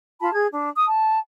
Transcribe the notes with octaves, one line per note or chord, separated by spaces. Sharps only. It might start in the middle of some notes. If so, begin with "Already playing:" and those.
F4 A5 B5
G#4 G#6
D4
D#6
A5